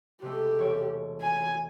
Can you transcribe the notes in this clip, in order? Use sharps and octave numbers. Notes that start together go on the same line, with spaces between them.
C3 G#3 A3 G4
E1 C#5 D7
G#5